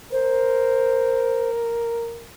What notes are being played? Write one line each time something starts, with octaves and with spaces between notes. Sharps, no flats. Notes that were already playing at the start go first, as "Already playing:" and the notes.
A#4 C5